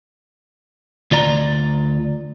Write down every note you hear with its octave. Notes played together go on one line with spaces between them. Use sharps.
D2 F4 D5 A#5